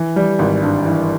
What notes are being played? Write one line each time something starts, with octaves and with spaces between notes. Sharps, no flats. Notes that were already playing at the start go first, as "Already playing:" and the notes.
Already playing: E3
G3
G#1
G2
E3